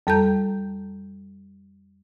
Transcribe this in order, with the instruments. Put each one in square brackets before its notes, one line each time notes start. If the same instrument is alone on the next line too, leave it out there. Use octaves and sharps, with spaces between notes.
[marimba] F2 G3 A4 A5 A#5 G6